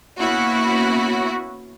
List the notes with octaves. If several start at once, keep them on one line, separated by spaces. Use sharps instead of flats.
A#3 B3 C#4 E4 F#4